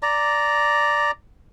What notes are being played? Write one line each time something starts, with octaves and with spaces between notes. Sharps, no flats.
D5 A#5